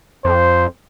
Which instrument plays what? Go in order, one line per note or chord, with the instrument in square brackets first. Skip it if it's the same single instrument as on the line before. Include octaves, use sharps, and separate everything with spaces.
[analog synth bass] F2 [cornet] C5